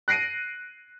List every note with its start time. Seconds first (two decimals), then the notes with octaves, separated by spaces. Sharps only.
0.08 F#6 A#6 C7 D7 D#7